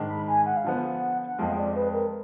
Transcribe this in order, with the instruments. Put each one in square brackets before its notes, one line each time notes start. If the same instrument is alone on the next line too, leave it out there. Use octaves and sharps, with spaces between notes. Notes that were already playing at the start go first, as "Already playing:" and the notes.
Already playing: [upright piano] G#2 D#3 G#3 D4
[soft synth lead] B5
G#5
F#5
F5
[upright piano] D3 F3 B3 [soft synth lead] F#5
[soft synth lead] F#5
[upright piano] F2 F3 G#3 [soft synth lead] F5
[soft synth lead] D5
B4
A#4